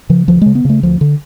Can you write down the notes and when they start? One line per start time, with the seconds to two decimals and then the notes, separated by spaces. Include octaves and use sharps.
0.09 C#3 F3
0.28 D2 F3
0.42 C#3 G#3
0.55 B3
0.65 C#3 A3
0.83 D2 F3
1.01 D3